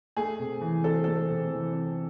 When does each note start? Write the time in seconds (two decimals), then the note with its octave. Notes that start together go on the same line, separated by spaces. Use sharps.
0.17 A3 G#4
0.39 C3
0.61 E3
0.84 C4 A4
1.04 A3 A4
1.28 C3
1.50 E3
1.73 C4